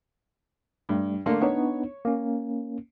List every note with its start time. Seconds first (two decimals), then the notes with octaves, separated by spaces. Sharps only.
0.89 G2 G3 A3
1.26 D3 A3 A#3 C6
1.42 B3 D4 D#4 C#5
2.05 A#3 C#4